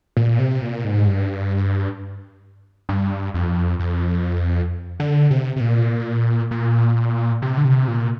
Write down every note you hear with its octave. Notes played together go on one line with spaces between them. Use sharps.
A#2
C3
A#2
G#2
G2
G2
F2
F2
D3
C3
C3
A#2
A#2
C3
D3
C3
A#2